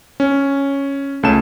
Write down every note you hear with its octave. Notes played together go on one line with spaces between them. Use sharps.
C#4
C#2 A3 C#4 A5 E7